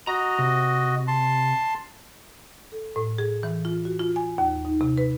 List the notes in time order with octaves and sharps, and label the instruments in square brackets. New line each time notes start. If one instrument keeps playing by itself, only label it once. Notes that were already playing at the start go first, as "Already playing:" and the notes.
[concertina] F#4 D#5 [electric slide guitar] A#5
[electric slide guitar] C3
[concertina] A5 C6
[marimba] A4
A2
G#4
E3
F4
F#4
F4
G#5
D#2
D#4
C3
B4